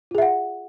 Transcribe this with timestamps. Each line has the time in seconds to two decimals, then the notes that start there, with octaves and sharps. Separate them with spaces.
0.11 F4
0.15 G#4
0.18 E5
0.22 F#5